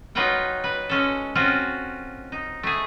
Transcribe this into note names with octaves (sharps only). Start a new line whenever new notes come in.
F#3 D#4 F4 B4 F#5 G5
B4
G#3 C#4 A4
C4 C#4 F4 F#4
D#4
A3 G#4